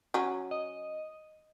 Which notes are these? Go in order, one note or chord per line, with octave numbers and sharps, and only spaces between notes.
F#3 C#4
D#5